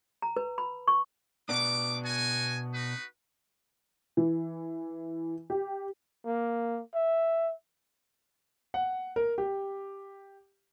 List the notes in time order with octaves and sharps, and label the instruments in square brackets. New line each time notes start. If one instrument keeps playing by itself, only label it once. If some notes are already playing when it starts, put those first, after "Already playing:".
[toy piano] A#5
B4
B5
C#6
[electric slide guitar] B2 B3 D4 [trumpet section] D6
[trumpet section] F#4 G#5
D#4 F#4 B4
[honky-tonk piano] E3
G4
[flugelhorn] A#3
E5
[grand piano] F#5
A#4
G4